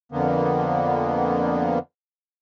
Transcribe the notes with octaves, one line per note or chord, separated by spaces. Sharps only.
F2 D3 A#3 B3